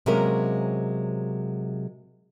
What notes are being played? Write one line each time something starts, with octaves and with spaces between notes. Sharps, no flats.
C3 F#3 G#3 A#3 C#4 A#4